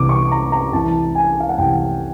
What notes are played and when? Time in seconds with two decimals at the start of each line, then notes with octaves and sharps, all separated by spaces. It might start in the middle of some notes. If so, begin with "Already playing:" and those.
Already playing: C2 C3 E3 D6
0.09 C#6
0.32 A#5
0.52 A#5
0.73 C2 C3 E3 A5
1.15 G#5
1.40 F5
1.49 F#5
1.58 C2 C3 E3 G5